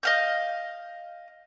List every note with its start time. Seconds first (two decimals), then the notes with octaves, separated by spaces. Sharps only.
0.03 D#5 F5 G6